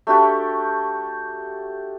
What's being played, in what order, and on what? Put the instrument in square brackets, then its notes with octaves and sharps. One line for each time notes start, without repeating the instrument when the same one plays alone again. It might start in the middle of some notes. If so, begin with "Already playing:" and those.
[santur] A3 D4 F#4 G4